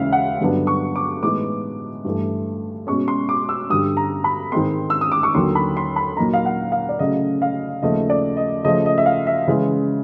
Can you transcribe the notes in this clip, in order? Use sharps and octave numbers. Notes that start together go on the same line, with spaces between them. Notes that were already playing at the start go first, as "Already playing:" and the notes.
Already playing: D#2 C#3 E3 G#3 C#4 E5 F5
F#5
G2 D3 F#3 B3 D4
C#6
D6
A2 E3 G#3 B3 D#4 D6
G2 E3 A3
B2 G#3 C#4 C#6
C6
D6
E6
G2 D3 G3 D#6
A#5
B5
G#2 D#3 G#3 C4 C6
E6
D#6
D6
C#6
D#2 D3 F#3 C6
B5
C6
B5
A#2 F#3 A#3 D#4 A#5
F5
F#5
F5
D5
C#3 F#3 A3 C#4 D#5
F5
D#2 C#3 F3 A3 D#5
D5
D#5
C#3 F3 A3 D#5
D#5
E5
F5
E5
C#3 E3 G#3